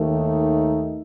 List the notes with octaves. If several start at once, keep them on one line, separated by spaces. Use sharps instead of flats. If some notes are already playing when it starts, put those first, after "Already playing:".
Already playing: D#2 D#3 A3
D#4